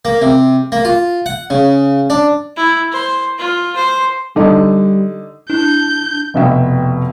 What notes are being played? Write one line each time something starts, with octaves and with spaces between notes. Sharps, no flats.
A#3
C3
A#3
F4
F#5
C#3
D4
E4
C5
F4
C5
D3 G3 D#4
D4 E4 G6
F1 B2 E5 G5